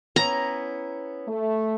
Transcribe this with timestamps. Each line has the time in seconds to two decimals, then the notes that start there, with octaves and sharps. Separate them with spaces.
0.16 B3 C#4 E4 A#5
1.27 A3